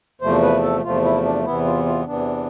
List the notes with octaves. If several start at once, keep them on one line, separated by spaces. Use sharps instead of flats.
E2 C3 F3 A3 C5
B4
A4
E2 C3 F3 A3 F4
E4
D4
E2 C3 E3 B3 E4
F4
F4
E2 C3 E3 B3 D4